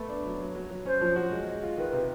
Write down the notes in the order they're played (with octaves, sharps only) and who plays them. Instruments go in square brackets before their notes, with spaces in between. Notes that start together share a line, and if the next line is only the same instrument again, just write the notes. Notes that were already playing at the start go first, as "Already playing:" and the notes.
Already playing: [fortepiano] A3 B3
D4
F#3
F#3
F#3
F#3
[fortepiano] C#4 [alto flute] C5
[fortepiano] F3
F#4
G#3
G#3
F4
[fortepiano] D#3 [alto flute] B4
[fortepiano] C3